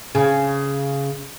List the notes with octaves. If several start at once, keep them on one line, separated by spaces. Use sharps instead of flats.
C#3